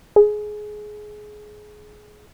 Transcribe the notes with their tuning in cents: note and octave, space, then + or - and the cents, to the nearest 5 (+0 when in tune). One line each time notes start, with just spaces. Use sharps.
G#4 +20